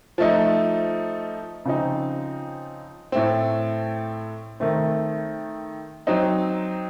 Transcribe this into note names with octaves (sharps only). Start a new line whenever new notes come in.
F3 A3 D#4
C#3 F3 C4 D#4
A2 A3 C4
D#3 A3 C4
F#3 C4 D#4